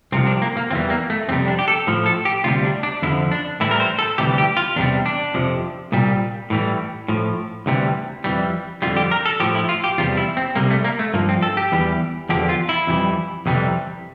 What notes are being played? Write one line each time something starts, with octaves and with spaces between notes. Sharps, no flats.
C2 C3 F3 C4
D4
A#3
A#3
E2 E3 G3 C4
A#3
A3
F2 C3 G3 C4
D4
G4
A4
A2 F3
A4
G4
D2 C3 G3 F4
D4
D4
F2 D3 F3 E4
D4
A2 E3 G3 E4
A#4
C5
A4
D2 C3 E3 G3 G4
G4
F4
E2 C3 G3 D4
D4
F2 C3 F3
C2 A#2 G3
A2 E3 G3
A2 F3
D2 C3 E3 G3
F2 E3 G3
F2 D3 G3 F4
G4
A#4
A4
A2 F3 G4
E4
F4
G4
E2 C3 G3 F4
E4
C4
C2 C3 G3 A#3
A3
A#3
A3
G2 F3 A#3
C4
A4
G4
E2 E3 G3
E2 D3 F3 G4
F4
E4
F2 E3 G3
F2 C3 E3 G3